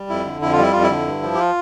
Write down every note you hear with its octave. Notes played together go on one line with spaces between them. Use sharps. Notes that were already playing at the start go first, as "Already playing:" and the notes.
Already playing: G3
F2 E4
D3
F2 E4
F4
G3 E4
F2 F4
E4
D3
G2
F3
G4
F4